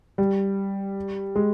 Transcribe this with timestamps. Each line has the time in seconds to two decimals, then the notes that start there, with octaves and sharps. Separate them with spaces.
0.18 G3
1.36 G#3